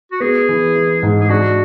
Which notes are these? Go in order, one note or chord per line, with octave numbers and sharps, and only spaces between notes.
F#4
B3 G#4
E3
E4
G#2
G#4
D4 F#4